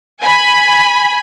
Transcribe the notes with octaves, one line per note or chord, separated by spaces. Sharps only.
G#5 B5